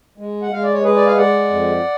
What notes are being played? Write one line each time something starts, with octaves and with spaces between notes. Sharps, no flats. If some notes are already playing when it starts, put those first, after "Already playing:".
G#3
F#5
G#3 F5
D5
C#5
G#3 G#4 B4
D5
F5
G#3 D5 F#5
F2